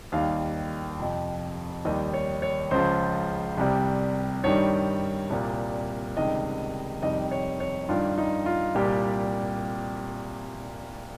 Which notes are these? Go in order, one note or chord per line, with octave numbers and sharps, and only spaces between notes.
D#2 D#3 G3 F5
F2 C3 F3
D#2 D#3 G3 D#5
C#5
C#5
C#2 C#3 F3 C5
C2 C3 G3
G2 D#3 G3 C#5
C2 A#2 G3
C#2 C3 D#3 G3 D#5
F2 C3 D#3 G3 D#5
C#5
C#5
G2 D#3 G3 F4
D#4
F4
C2 A#2 G3 G4